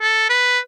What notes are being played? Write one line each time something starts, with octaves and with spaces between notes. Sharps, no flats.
A4
B4